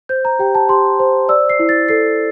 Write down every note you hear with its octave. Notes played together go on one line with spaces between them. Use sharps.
C5 G6
A#5
G4 G5
A5
G4 C6
C5
D5 E6
C7
E4
A6
A4 C7